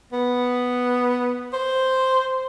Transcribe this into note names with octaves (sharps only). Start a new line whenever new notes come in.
B3
C5